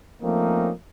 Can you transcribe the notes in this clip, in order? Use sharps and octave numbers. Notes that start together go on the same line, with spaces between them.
F3 A3 A#3 C4 C#4 D#4